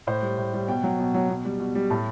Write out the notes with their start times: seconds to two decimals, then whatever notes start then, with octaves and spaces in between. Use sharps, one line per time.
0.07 A2 C5
0.22 G3
0.38 A2
0.53 G3
0.68 B2 G5
0.84 F#3
0.99 B2
1.14 F#3
1.29 B2
1.45 G3
1.60 B2
1.75 G3
1.90 A2 A5